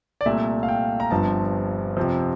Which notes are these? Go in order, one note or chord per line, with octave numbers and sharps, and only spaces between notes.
D5
C2 A#2 A3 E5
F5
G5
A#5
G1 G2 F3 C4 A5
F2 C3 F3